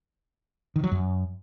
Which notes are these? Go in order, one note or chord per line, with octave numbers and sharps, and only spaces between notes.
D#3
F#3
F#2